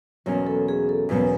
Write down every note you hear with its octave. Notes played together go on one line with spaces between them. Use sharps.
E2 B2 F#3 A#3 C#4 C#5
A4
G#4
A4
E2 B2 F#3 A#3 C#4 B4